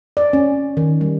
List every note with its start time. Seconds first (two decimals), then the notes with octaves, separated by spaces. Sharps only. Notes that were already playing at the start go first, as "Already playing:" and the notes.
0.17 D5
0.33 C#4
0.77 D#3
1.01 G3